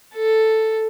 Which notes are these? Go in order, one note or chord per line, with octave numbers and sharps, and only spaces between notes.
A4